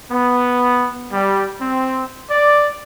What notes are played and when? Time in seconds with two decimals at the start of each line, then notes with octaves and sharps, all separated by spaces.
0.11 B3
1.12 G3
1.61 C4
2.31 D5